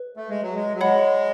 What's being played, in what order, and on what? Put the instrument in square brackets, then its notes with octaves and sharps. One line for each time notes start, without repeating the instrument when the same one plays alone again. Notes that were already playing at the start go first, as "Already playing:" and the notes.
Already playing: [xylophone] B4
[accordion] A3
G#3
F#3
G#3
F#3
[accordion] G#3 [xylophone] C#5 F#5 B5